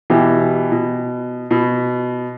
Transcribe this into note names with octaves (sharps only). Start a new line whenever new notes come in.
B2 E3 G4
B2
B2